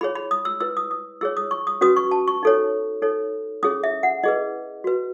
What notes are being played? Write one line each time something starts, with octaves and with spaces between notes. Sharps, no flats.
E4 G#4 C#5 B5
B5
D#6
E6
E4 B4 E6
D#6
D#6
E4 G#4 C#5 E6
D#6
C#6
D#6
C#4 F#4 B4 D#6
C#6
A5
C#6
D#4 A4 C#5
D#4 A4 C#5
C#4 E4 G#4 C#5 D#6
E5
F#5
E4 G#4 B4 D#5
F#4 B4